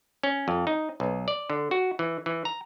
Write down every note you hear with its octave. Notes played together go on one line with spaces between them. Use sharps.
C#4
F2
D#4
B1
D5
D3
F#4
E3
E3
A#5